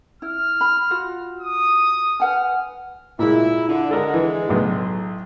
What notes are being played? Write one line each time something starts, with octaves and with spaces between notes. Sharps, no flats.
E4 F6
B5
F4 F#4
D#6
B4 F#5 G#5 F6
A#2 G#3 E4
D3
D3 G#3 A4 A#4 F#5
E3
B1 A2 B3